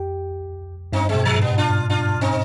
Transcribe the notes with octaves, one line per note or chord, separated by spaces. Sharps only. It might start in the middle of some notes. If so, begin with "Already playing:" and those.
Already playing: F2 G4
G2 C4 D#4
G#3 C4
B2
F3 G#3
G#2 G3 B3
D4 F4
D4 F4
C4 D#4